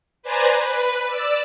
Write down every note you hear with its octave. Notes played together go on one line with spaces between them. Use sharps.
B4 C5 D5 G#5 A#5
B4
D5 E6